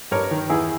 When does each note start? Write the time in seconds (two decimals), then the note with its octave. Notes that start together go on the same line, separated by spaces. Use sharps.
0.11 G2 A#4 C#5
0.31 D#3
0.50 E2 E4 G#4